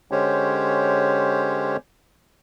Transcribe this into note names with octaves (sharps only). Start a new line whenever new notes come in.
D3 G#3 C#4 G4 C5 C#5